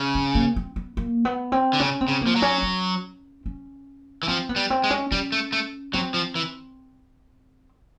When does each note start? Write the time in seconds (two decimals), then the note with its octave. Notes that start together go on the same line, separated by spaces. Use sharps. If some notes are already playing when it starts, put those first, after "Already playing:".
Already playing: C#3
0.15 C4
0.35 A#3
0.56 C4
0.76 B3
0.97 A#3
1.25 B3
1.52 C4
1.73 D3
1.80 C#3 C#4
2.01 C4
2.08 C#3
2.21 A#3
2.27 F3
2.36 F#3
2.42 C#4
2.63 C#4
3.46 C#4
4.23 E3
4.28 F3 C4
4.49 B3
4.56 G3
4.70 C4
4.84 G#3
4.91 C#4
5.11 G3 C#4
5.32 A3
5.52 A3
5.93 F#3 C4
6.14 F3
6.35 E3